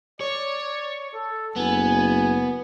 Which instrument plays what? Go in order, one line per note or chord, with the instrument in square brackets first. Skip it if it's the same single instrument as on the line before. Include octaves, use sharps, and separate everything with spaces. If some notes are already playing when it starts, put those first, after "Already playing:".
[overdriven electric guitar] C#5 [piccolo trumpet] D5
[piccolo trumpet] A4
[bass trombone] F#1 [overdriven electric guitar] B3 [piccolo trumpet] G#5